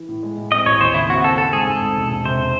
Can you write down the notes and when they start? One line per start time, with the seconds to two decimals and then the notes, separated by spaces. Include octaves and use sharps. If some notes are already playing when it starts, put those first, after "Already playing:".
Already playing: E3
0.09 A2
0.23 G#3
0.38 A2
0.52 C4 D#5
0.66 A1 C#5
0.80 D#2 C5
0.94 C#3 E4
1.10 C4 F#4
1.24 C4 A4
1.38 C4 A4
1.53 G#2 G#4
1.67 G#2 A4
1.82 G#2
1.97 E1
2.10 E1
2.25 C3 C5